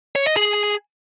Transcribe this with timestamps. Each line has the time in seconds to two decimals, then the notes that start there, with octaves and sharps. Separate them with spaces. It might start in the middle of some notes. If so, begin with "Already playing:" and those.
0.16 C#5
0.26 D#5
0.36 G#4